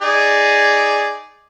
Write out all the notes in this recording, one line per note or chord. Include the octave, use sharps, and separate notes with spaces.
D#4 G#4 D5